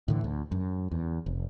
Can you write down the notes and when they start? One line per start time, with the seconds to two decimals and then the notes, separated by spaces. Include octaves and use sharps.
0.08 A2 D3 E3
0.24 D2
0.52 F#2
0.91 E2
1.26 F1